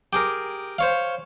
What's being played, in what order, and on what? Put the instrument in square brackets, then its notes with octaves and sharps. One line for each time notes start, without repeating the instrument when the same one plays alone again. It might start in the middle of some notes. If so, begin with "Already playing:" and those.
[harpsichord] G4 G#4 A#4
C5 C#5 F5